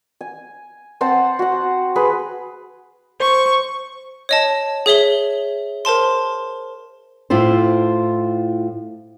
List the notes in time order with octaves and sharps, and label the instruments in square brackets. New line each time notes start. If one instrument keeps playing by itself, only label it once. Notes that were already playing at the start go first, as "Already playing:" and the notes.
[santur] G#5
C4 C5 F#5 A5
F#4 F#5
G#4 B4 C6
[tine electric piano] C5 [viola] C#6
[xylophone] C#5 D#5 A5
G#4 C#5 E5 G7
A#4 C5 A5 C6
[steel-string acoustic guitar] A2 E4 F4 C5